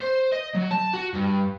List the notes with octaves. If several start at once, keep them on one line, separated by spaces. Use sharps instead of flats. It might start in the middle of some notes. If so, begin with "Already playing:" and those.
C5
D#5
F#3
A5
F#4
G2